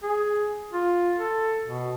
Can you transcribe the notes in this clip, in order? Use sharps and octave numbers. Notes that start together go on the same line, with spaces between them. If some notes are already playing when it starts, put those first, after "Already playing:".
G#4
F4
A4
B2